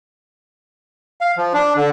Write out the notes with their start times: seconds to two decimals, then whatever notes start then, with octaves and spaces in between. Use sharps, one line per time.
1.21 F5
1.37 F3
1.53 D4
1.76 D3